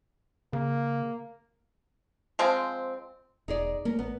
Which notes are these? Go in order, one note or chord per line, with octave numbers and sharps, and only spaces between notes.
C#3 A#3
F3 G#3 C4
E1 D#4 G#4 D5
A3 A#3 C#4 A#4
A1 B3